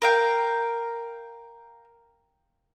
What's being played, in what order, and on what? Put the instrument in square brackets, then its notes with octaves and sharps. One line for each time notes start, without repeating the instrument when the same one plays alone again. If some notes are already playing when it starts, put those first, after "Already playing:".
[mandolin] A#4 F5 G5